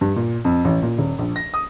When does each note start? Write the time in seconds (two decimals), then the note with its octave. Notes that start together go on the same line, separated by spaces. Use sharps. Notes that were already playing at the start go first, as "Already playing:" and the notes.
0.01 G2
0.16 A#2
0.45 F2
0.65 A1
0.83 A#2
0.98 D#1
1.19 A#1
1.36 A#6
1.54 D#6